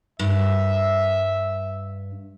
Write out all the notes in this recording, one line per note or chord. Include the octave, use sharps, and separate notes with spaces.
G2 E5